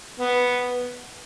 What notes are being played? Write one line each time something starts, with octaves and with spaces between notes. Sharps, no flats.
B3